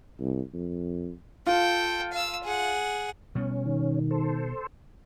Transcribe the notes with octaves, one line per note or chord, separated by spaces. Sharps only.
C2
F2
F4 A4 G5
F5 E6
G#4 F#5
B2 G3 B3 C#4
D#3
A4 C5